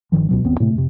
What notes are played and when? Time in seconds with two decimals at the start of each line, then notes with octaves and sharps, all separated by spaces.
0.12 G1 D#2 D#3 F3
0.29 C#2 B2 F#3
0.44 G1 D#2 B3 C4
0.60 A2 C3 A3
0.75 F2 C3